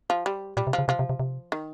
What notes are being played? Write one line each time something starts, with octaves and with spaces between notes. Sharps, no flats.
F3
G3
A#2 G3
C3
F3
C#3
C3 F3
C3
C3
C3
D#3